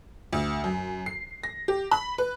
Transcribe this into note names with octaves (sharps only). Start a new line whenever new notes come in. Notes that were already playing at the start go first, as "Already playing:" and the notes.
D2
F#2
C7
A#6
G4
B5
B4